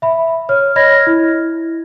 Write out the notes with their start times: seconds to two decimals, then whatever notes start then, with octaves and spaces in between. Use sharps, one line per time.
0.02 E5 B5
0.49 C#5 F6
0.76 C#5 D#5 B5 F6 G#6 A#6
1.07 E4